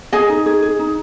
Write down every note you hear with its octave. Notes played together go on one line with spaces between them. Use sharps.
G#4 D#5 G#5
D#4
G#4
G#4
D#4